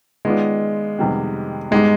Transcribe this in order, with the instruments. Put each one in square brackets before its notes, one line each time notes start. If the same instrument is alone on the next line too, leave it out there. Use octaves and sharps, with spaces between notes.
[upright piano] D#3 B3 F4 B4 D5 [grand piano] G#3
[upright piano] F2 C3 D#3 G3 B3
[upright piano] G#2 G3 B3 D#4 G4 [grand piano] G#3